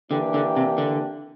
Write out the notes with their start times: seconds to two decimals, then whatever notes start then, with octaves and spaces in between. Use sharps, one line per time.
0.11 D3 E3 A#3 D4 G4
0.34 D3
0.56 C3
0.78 D3